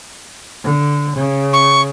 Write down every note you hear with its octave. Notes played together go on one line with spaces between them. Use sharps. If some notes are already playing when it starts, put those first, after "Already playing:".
D3
C#3
C#6